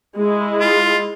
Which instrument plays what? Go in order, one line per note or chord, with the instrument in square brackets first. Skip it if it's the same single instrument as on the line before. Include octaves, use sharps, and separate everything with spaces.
[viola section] G#3 E4
[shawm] F4